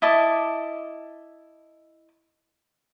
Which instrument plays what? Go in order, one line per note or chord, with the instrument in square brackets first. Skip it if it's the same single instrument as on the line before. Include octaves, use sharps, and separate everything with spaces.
[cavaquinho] E4 D#5 A5 D6